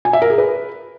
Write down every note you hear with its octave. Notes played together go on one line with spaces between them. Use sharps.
G#5
E5
A#4
G#4
B4